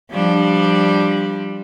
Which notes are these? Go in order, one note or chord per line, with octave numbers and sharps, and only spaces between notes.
F3 G3 D4